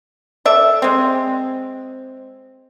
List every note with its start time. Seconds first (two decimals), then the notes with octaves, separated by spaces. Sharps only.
0.45 A4 D5 E5
0.82 G#3 C4